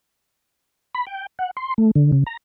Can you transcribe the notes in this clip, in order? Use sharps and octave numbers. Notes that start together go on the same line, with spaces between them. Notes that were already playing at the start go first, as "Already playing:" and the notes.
B5
G5
F#5
C6
A3
D3
C#3
A#5